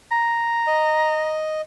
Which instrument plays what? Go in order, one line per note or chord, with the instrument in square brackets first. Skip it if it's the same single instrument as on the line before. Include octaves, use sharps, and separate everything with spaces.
[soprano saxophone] A#5
[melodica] D#5